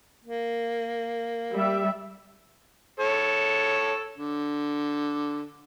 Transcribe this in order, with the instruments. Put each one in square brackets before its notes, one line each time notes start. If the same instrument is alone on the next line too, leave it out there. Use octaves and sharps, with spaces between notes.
[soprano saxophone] A#3
[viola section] G3 E5
[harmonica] A4 C#5
D3